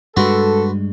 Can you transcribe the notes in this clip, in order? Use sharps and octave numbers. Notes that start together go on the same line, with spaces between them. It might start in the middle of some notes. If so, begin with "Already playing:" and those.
G2 G#3 F#4 A4 B4 C6